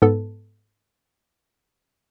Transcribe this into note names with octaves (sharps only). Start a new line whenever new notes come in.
G#2 B3 A4